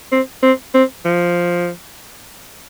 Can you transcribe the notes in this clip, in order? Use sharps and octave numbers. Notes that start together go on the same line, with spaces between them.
C4
C4
C4
F3